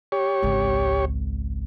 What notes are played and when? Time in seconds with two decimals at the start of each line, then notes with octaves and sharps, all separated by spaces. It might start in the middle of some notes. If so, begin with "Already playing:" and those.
0.12 G4 C#5
0.43 G#1 C#2